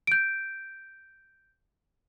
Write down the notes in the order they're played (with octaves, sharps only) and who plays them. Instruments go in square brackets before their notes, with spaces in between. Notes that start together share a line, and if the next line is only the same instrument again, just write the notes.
[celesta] G6 D7